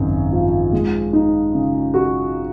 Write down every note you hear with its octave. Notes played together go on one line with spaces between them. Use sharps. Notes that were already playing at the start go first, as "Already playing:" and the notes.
Already playing: G#1 F#2 C#3
F3
G#3
D#4
C#3
F#4